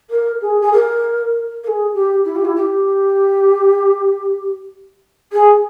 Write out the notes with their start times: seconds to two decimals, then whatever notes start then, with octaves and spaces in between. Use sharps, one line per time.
0.10 A#4
0.41 G#4
0.60 G#4
0.72 A#4
1.63 A#4
1.67 G#4
1.94 G4
2.24 E4
2.35 G4
2.45 E4
2.56 G4
5.32 G#4